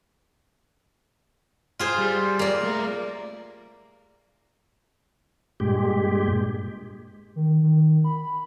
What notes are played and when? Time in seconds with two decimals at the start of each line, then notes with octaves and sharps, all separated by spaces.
1.79 F4 G#4 C5
1.98 G3
2.39 A#3 D5
2.63 A3 A#4
5.60 G2 A#2 G#3 G4
7.36 D#3
7.63 D#3
8.04 B5